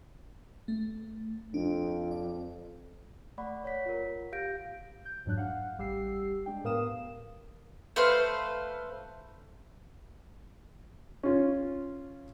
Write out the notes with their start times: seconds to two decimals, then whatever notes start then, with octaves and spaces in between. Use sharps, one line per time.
0.68 A3
1.54 F2 D4
2.11 D5
3.38 A3 D5 F#5 B5 C#6
3.64 C#5 F#5 B6
3.86 F4 A#4
4.32 G4 F5 G6 A#6 D7
5.05 G6
5.25 F2 G#2 F#3 D4 F#6
5.37 F5 F#5
5.78 A1 G3 G4 E6 C7
6.46 G#3 D4 G5
6.64 A2 B3 A#4 F5 D#6 E7
7.96 A3 B4 C5 F5
11.23 C#4 F4